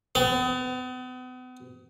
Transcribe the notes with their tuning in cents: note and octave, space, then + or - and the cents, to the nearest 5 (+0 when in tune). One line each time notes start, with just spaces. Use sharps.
B3 +40